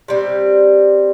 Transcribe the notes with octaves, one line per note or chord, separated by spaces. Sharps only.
C3 G3 C4